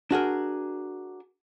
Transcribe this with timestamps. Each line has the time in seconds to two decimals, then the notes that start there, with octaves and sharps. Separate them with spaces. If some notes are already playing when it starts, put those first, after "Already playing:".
0.11 D4 F#4 G#4 A#4